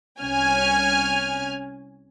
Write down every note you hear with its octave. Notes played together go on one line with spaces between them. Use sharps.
C2 C#4 G#5 F6